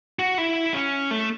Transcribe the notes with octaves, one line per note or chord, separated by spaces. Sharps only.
F#4
E4
C#4
A3